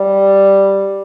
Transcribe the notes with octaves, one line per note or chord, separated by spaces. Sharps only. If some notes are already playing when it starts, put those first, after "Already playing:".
Already playing: G3